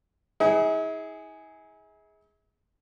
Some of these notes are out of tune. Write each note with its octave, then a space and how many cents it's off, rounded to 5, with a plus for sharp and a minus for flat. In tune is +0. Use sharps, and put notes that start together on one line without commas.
E4 -45 G#4 +0 F#5 +45